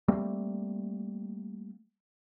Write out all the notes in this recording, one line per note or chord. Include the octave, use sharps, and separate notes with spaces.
G3 A3 A#3 C4